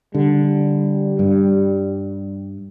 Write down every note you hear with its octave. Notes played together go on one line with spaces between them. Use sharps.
D3 G3
G2